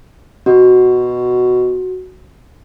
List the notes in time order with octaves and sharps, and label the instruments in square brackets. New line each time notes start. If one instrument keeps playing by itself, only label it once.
[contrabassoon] B2 [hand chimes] F#4